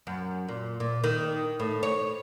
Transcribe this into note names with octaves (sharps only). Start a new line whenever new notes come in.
F#2
A#2
A#2
D#3
A2
C#5